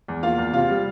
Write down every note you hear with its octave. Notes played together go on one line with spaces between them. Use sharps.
E2
A#3 F4 F5
E2
C3 F4 F5
G3